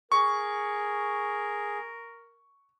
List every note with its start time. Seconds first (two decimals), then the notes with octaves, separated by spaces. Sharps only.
0.12 G#4 A#4 C#6